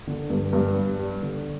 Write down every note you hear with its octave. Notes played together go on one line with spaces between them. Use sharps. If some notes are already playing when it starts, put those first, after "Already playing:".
D3
G2
G2
G3
G3
D3